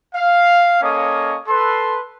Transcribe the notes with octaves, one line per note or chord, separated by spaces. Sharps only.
F5
A#3 C#4 A4 C#5 D#5 D#6
A4 B4 C6